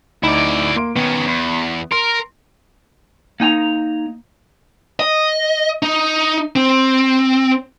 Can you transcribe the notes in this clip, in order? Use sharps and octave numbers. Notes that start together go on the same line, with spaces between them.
D2 D#4 E4 D5 B5
A#3 C6 D7
D#3 B3 C#4
E2
A#4 C6
A#3 D#4 G5 A#5
D#5
D#4
C4